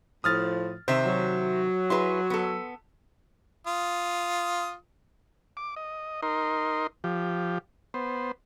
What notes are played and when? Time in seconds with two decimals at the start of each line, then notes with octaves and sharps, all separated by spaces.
0.24 A2 F3 D#6 F6 A6
0.88 C3 D#3 C5 E5
1.05 F#3
1.90 E4 G#4 B4 C6
2.30 B3 A4
3.67 F4 D#6
5.57 D6
5.76 D#5
6.23 D#4 A#4 C6
7.04 F3 G4
7.94 B3 C5